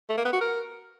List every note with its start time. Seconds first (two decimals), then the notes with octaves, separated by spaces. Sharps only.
0.10 A3
0.17 A#3
0.25 B3
0.33 F#4
0.41 A#4